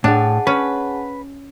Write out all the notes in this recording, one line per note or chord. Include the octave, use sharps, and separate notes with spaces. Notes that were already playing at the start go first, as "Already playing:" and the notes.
A2 D4 G#4 F#5 A5
C#4 B4